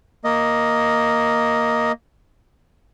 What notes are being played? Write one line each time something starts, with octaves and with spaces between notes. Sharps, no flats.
A#3 D#5